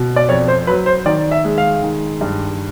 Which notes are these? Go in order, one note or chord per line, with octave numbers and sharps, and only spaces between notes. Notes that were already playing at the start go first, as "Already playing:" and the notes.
Already playing: B2
D5
F2 C#5
C5
F#3 B4
C5
D#3 D5
E5
G#3
F5
D#3
G2